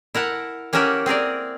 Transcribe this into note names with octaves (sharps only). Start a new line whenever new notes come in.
E4 A#4 F#5 A5
A#3 C#4 G4 A#4 E5 F#5
C4 G#4 A#4 D5